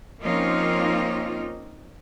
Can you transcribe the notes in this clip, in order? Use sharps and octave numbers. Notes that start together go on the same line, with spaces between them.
F3 A#3 C4 C#4 D#4 F4